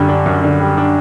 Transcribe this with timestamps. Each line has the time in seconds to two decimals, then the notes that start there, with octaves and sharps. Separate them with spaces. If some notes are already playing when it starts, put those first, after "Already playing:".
Already playing: F#2 D3 G3
0.09 D4
0.26 F#2
0.44 D3
0.60 G3
0.78 D4